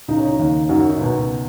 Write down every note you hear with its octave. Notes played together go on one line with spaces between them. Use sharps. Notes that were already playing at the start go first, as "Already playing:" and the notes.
C#2 C#3 D#4
C#4
D#4
D#2 C#3
F#2 D#3 F#4
F#4
D#4
C#2 B2